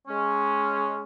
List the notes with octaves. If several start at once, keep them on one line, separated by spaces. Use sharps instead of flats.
G#3 C#4